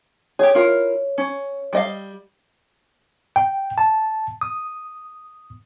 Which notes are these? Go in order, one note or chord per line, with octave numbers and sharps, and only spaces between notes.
G4 G#4 C#5
E4 F4 A#4
C#4
G3 D#5 F5
G5
A5
D#6